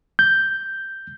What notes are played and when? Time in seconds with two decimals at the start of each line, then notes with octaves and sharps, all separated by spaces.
0.19 G6